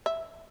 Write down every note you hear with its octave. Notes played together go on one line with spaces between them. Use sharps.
E5